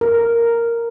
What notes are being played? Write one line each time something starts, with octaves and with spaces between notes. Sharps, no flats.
A#4